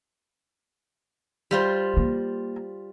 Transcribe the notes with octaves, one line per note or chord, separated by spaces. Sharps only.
G3 F4 C5
A#3